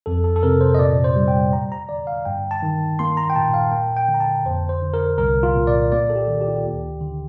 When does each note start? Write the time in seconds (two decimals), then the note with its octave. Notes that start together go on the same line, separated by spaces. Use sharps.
0.06 F2 A4
0.24 A4
0.36 A4
0.43 C3 A#4
0.61 C5
0.75 D#5
0.79 A#2 D5
1.04 C5
1.16 G3
1.28 G5
1.53 A#3 A#5
1.72 A#5
1.89 D3 D5
2.07 F5
2.25 G2 G5
2.51 A5
2.63 D#3
2.99 A#3 C6
3.17 A#5
3.30 G5
3.36 A#2 A5
3.54 F5
3.72 A#3 G5
3.97 G5
4.09 D3
4.14 A#5
4.20 A5
4.45 F2 C5
4.69 C5
4.82 D3
4.94 A#4
5.18 C2 A#4
5.43 F4
5.56 A#2
5.67 D5
5.92 A#3 D5
6.10 A4
6.16 G4
6.28 D#3
6.41 G4
6.48 F4
6.56 G4
6.65 D2
7.01 D3